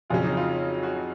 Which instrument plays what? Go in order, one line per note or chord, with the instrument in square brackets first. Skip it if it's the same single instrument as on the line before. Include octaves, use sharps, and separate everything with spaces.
[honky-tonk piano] F2 C#3 F#3 C#4 [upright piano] F4
[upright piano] D#4
F4
F#4